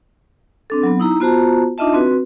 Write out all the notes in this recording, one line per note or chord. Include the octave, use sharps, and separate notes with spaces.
C4 D4 A4
F#3 B3
D#4 E4 A#5
B3 F4 F#4 C5 A5 A#5
D4 D#4 F4 D#5 E5 A5
C4 F#4 B4